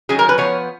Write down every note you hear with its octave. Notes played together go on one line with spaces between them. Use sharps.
D#3 F#3 C#4 G#4
A#4
B4
F3 B3 C#5